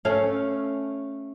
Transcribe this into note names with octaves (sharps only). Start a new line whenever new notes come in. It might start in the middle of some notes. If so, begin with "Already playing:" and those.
A3 C#4 F5